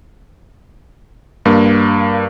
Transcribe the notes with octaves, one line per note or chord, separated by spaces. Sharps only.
G2 A#3